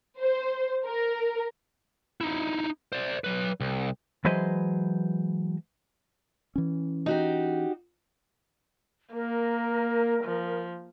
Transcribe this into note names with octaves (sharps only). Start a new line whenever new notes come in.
C5
A#4
D#4 E4
C5 D5
F#3 B4
C2
E3 F#3 G#3 B4 C5 D#5
E3 C#4
D#4 F#4 G4
A#3 A#4
F3